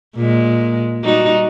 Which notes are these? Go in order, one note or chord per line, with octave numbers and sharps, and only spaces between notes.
A#2 G#3
G3 D#4 F#4